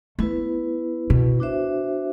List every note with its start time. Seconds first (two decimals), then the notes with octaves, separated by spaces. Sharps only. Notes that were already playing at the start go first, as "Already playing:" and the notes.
0.19 A3 B3 E4 B4
1.10 B2
1.40 D4 F#4 C5 E5